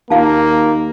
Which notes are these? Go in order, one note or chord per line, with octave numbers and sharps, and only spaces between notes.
D#2 A#3 F4 F5 A5